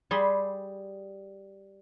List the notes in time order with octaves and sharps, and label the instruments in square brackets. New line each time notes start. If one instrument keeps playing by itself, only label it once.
[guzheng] G3 G#4 B5 C6